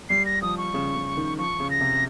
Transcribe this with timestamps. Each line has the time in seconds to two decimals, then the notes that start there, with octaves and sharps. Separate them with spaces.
0.09 G3 C7
0.26 A#6
0.42 F3 D#6
0.58 C#6
0.74 C#3
0.96 C#3
1.17 D#3
1.38 F3 C#6
1.60 C#3
1.70 A#6
1.81 C3